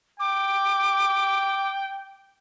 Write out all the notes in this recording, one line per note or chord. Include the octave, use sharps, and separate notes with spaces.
G5 D6